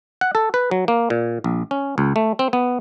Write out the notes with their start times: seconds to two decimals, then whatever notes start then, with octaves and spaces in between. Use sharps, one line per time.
0.21 F#5
0.35 A4
0.54 B4
0.71 F#3
0.88 A#3
1.10 A#2
1.44 A#1
1.71 C#4
1.98 C#2
2.16 A3
2.39 C4
2.53 B3